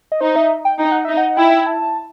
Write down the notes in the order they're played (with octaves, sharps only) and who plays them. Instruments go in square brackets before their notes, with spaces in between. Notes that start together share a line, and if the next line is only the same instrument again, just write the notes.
[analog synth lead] D#5
[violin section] D#4 [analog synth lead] C5
[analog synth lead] E5
G5
[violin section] D#4 [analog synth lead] G5
[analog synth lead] F#5
[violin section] D#4 [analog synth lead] E5
[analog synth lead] F#5
[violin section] E4 [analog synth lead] G5
[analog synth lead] A5